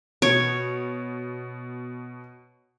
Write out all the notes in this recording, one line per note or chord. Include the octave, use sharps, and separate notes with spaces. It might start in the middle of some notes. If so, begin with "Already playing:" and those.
B2 C#5